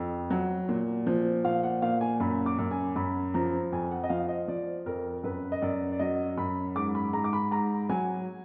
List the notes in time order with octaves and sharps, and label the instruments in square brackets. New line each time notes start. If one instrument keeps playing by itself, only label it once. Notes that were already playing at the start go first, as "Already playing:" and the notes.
Already playing: [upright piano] F2
F#3
A#2
F3
A#2 F5
F#5
A#2 F5
G#5
F#2 B5
D6
F#2
G#5
F#2 B5
F3 A#5
F2 G#5
F#5
D#5
F3 F5
D#5
F3 D5
F2 A#4
F#2 B4
D#5
F#2 D5
D5
F#3 D#5
F#2 B5
G#2 D6
B5
G#2 A#5
D6
B5
G#2 A#5
F#3 G#5